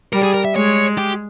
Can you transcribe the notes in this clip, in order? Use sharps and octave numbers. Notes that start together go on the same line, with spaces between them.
G3 A#4
G#4
A#4
E5
G#3 C#5
G4